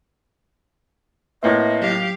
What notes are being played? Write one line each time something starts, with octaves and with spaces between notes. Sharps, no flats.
A2 A#3 C4 A4 B4 D#5 E5
F#3 G4 F5